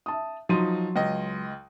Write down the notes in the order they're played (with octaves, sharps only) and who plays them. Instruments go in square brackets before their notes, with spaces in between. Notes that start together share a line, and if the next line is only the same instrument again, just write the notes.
[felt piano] E5 A5 D#6
[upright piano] F3 D#4 [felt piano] F#3 C6 D#7
[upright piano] C#2 D#5